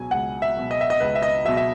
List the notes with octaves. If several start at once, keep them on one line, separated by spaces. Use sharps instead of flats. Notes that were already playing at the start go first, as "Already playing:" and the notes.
Already playing: C#2 B2 F#3 G#5
C#2 F#5
E5
B2 F#3
D#5
E5
D#5
C#2 B4
E5
D#5
B2 F#3 E5
E5